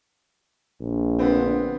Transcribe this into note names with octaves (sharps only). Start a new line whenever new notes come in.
A#1
D3 B3 C4